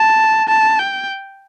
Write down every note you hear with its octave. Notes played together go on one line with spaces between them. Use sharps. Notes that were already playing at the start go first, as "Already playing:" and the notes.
Already playing: A5
A5
G5